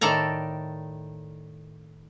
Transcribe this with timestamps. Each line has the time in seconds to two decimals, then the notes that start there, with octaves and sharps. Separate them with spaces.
0.01 A2 D#3 A4 D5 A#5